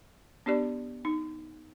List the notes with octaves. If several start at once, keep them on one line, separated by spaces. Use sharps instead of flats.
B3 D4 G4 D5
D#4